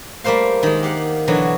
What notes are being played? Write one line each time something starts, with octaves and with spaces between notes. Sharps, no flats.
G3 A3 A#3 C5 F5
D#3 G#3
G4 F5 F#5
B2 D3 E3 F#3 F#4